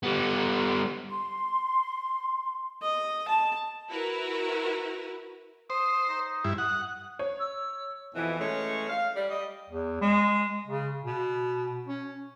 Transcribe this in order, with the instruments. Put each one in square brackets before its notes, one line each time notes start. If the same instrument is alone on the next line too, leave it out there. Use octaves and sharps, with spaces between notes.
[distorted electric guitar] G3 B3
[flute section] C6
[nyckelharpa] D#5
A5
[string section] E4 F#4 A#4 B4
[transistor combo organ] C5 [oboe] D#6
[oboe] D#4
[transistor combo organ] G2 E4
[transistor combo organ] F#5 [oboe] D#6
[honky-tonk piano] C#5
[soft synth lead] E6
[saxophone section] F2 B2 E3
E3 G#3 A3 C#4 C#5
F5
G3 D5
G3 D#5
[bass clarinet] E2
G#3
C#3
B2
C#4